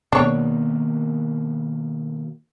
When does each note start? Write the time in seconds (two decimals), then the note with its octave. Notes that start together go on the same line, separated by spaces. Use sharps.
0.12 B2 D#3 A#3 D4 C#5